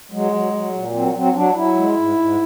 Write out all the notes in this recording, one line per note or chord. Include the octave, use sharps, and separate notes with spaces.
F#3 G#3
F#3
F#3
A#2
F#3 C4
F#3 C4
F#3 D4
F#3 E4
G#3
G#2
G#2